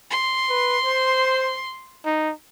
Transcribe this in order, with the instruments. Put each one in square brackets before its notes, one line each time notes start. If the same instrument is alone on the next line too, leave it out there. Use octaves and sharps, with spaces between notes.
[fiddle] C6
[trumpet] B4
C5
D#4